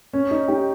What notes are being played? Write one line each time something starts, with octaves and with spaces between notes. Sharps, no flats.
C#4
D#4
D#4 G4